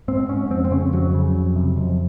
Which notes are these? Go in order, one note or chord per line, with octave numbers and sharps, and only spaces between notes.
G#2 C4
G#2 C#4
F2 C4
C4
C#3 C#4
F2 F#3
C#3
F2
C3
F2